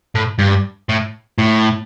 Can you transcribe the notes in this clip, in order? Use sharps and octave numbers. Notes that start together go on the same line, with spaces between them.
A2
G2
A2
A2